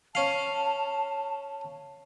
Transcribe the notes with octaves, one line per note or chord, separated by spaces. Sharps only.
C#4 F5 A5